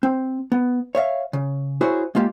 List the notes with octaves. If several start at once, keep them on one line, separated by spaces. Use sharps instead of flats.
C4
B3
C#5 E5 F5
C#3
E4 F#4 G#4 C5 C#5
G#3 A#3 F4 G4